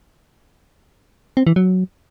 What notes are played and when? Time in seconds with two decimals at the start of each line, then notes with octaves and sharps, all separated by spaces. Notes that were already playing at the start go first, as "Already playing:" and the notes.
1.37 C4
1.47 E3
1.56 F#3